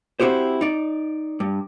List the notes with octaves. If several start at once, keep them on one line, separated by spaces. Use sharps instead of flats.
C4 E4 F#4 G4 C5
D#4 D5
G2